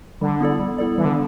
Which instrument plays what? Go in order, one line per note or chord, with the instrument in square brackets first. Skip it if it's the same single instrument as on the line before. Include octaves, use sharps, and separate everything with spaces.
[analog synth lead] D3 [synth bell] G3
[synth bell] B3 E4 A4 D5
G3
B3 E4 A4 D5
[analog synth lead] E3 [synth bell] G3
[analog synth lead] D3